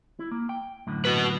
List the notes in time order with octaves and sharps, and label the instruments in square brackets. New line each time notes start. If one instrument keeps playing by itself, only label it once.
[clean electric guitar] E4
A#3
G5
F#2 A2 D3
[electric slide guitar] F#4 B4